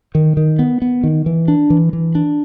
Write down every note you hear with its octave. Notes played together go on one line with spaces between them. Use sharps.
D#3
D#3
B3
B3
D#3
E3
D4
E3
E3
D4